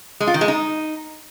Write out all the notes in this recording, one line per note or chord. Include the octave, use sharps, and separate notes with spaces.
G#3
F4
D#3
G#3
D#4